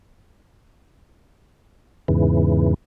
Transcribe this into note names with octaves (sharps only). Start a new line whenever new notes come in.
E2 G#2 C#3 E3